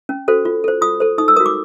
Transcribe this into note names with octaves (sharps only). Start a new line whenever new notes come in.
C#4
F#4 A4 C5
F4
A4 C5
F4 D#6
A4 C5
D#4 D#6
E6
F#4 A#4 D#6
D6